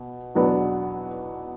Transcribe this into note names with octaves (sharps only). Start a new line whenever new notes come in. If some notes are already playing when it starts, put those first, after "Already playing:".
Already playing: B2
E2 B2 F#3 B3 D4